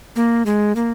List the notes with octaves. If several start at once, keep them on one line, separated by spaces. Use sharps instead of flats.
A#3
G#3
A#3